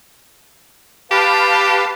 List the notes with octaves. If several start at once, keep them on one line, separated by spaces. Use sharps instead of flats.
G4 B4 F5 A5